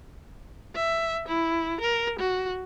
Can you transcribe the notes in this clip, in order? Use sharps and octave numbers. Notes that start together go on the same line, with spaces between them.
E5
E4
A#4
F#4